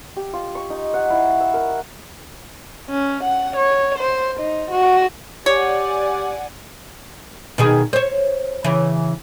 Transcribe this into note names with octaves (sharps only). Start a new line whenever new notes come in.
G4
F4
C#6
D#4
F#5
E4
E6
A#4
C#4
F#5
C#5
C5
D#4
F#4
G4 C#5 D5 F#5 G#5
B2 D#3 G#4
C5 C#5
C#3 E3